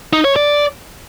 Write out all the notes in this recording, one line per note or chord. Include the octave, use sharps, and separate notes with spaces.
D#4
C#5
D5